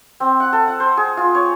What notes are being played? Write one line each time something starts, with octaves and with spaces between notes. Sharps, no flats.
C4
F#5
A4
F#5
C5
G#4
F4
C#5